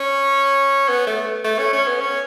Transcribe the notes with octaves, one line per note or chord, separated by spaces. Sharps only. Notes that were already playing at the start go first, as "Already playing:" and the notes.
Already playing: C#4
B3
A3
A3
C#4
C#4
B3
C#4